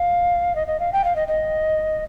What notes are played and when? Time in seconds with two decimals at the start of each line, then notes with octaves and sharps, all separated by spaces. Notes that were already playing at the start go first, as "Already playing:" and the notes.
Already playing: F5
0.56 D#5
0.67 D#5
0.80 F5
0.93 G5
1.04 F5
1.16 D#5
1.28 D#5